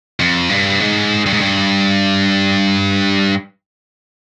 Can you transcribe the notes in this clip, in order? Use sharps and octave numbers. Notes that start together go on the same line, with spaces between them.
F2
G2
G#2
G2
G#2
G2